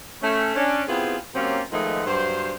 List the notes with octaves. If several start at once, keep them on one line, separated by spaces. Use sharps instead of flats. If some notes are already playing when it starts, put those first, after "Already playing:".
A3 C#4
C#4 D4
B3 C4 E4 F4 G4 G#4
F#3 A#3 C4 C#4 F4 G4
D#3 F3 G#3 A3 B3 D#4
G2 F#3 C5